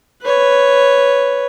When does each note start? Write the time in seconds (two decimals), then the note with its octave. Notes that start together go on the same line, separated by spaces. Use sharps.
0.22 B4 C#5